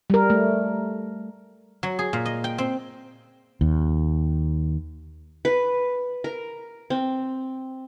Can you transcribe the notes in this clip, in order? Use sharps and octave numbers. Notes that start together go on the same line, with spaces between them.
G3 A#4
A3
F#3
G#4
A#2
D#5
G5
C4
D#2
B4
A#4
C4